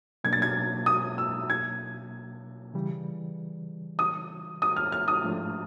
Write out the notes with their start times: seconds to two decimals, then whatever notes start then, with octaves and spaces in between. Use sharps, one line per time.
0.24 B2 F#3 A#3 D4 G#6
0.33 A6
0.42 G#6
0.86 D#6
1.18 E6
1.50 G#6
2.73 C#3 E3 G3
3.99 D#6
4.62 D#6
4.76 F6
4.92 F6
5.08 D#6
5.24 G#2 F3 A3 D4 F4